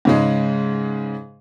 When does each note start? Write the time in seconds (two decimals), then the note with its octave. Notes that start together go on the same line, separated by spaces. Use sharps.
0.05 G#2 C#3 G#3